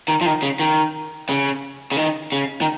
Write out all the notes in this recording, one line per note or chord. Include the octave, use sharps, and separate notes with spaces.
D#3
F3
D#3
C#3
D#3
C#3
C#3
D#3
C#3
D#3